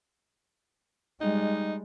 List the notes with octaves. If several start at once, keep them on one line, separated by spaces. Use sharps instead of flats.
G3 G#3 D#4